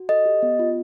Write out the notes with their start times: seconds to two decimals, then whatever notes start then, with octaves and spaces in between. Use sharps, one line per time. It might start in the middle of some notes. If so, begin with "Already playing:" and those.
Already playing: F#4
0.09 A4 D#5
0.26 G4
0.43 B3
0.59 F4